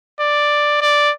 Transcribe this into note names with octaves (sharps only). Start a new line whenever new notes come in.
D5
D5